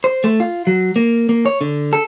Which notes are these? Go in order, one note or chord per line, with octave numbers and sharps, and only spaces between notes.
C5
A3
F4
F#3
A#3
A#3
C#5
D3
A4